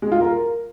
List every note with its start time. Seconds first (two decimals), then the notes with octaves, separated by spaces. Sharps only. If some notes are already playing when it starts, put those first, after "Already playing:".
0.02 G#3
0.12 F4
0.21 A#4